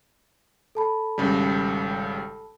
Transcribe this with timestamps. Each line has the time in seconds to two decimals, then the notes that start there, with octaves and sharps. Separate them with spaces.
0.75 A4 A5 B5
1.18 G#1 C#3 G3